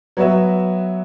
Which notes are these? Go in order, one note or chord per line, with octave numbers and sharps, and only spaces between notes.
F#3 B3 F#4 B4 E5